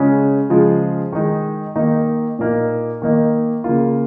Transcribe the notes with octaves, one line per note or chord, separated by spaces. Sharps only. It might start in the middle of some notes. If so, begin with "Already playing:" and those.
Already playing: C#3 G#3 C#4 F4
C#3 F3 G#3 F4
D#3 G#3 D#4
D#3 A#3 D#4
A#2 A#3 D#4
D#3 A#3 D#4
C#3 A#3 F4